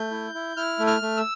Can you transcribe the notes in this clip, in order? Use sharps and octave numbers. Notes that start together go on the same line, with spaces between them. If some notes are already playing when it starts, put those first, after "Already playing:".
Already playing: A3 G6
E4
E4
E4 F6
A3
F6
A3
E6